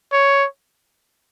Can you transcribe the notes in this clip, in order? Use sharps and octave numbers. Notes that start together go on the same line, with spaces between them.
C#5